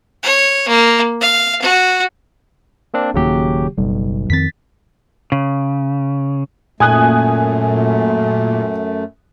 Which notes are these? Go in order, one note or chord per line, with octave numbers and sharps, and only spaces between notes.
C#5
A#3
F5
F#4
A#3 C4 D4
D#1 D#2 C#3 F#3 A#3 G4
F#1 B1 G3
F2 D#3 C4 A6 B6
C#3
F#2 A#2 A3 G#5 D#6 F#6